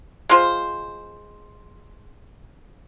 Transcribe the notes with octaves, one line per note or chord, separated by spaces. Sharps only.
G#3 F4 C5